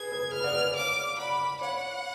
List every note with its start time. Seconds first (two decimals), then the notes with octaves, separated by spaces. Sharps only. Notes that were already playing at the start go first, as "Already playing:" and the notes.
Already playing: G#4 B4 G#6
0.12 G#4 B4
0.33 G#4 B4 F6
0.43 D5 F#5
0.54 B4 D5
0.75 C#5 F5 D6
1.18 D5 F#5 B5
1.61 C#5 F5 F#5